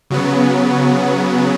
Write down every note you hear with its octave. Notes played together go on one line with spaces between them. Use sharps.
C#3 F#3 B3